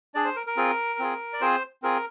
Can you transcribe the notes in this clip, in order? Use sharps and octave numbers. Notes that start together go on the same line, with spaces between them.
D4 G#4 D5
C5
A#4
A#4
C4 F4 G#4
C4 F4 G#4
D5
C4 F4 G#4 C5
C4 F4 G#4 A#4